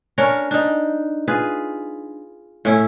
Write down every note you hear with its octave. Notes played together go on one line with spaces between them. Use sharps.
C#4 D4 A#4 C#5
D4 D#4
F4 G#4 B4
A2 C#4 E4